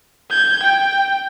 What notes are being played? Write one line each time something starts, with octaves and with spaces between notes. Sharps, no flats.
G6 G#6
G5